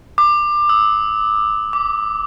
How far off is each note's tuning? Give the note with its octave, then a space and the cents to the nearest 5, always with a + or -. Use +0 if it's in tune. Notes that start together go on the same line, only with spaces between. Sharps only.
D6 +20
E6 -30
D6 -10